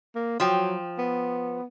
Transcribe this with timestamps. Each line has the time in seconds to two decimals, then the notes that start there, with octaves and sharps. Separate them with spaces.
0.15 A#3
0.40 F3 F#3 G5
0.98 B3